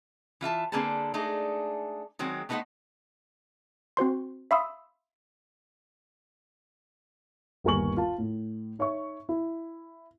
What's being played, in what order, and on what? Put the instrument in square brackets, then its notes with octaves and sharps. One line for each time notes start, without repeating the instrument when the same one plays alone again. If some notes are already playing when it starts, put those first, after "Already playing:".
[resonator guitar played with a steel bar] E3 F4 E5 A5
D3 A#3 C4 G#4 B4 A5
G#3 A3 D4 D#4 G#4
D#3 F#3 G#3 C4
A3 B3 D#4 A#4 C5 F#5
[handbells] C4 F#4 C5 C6
E5 F5 B5 C6 D#6 E6
[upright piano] G1 D#2 A#4 G#5 C#6 F#7
F4 A5
A2
D#4 C#5 E5 C#6
E4